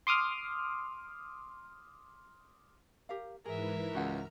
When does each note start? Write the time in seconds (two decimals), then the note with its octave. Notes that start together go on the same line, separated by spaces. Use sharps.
0.07 C6 D6 D#6 F6
3.09 G4 A#4 F5
3.46 G#2 E3 G#4 A#4 B4 E5
3.95 C#2 F#4 F#5 A#5 F6 A#6